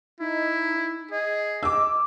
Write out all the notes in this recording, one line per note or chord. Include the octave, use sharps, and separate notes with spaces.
D#4 E4
G#4 D#5
D6 E6